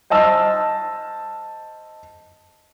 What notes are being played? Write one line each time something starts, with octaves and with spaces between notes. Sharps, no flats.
C5 D#5 A5 E6 F6